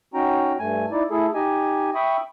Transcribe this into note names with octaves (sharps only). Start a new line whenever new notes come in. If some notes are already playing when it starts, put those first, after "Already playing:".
C#4 D#4 F#4 G5 A#5
G2 A3 G#5
D#4 E4 D5
A3 E4 G#4 A4
D#4 G4 D#5 G#5
E5 G5 B5 C#6 D#6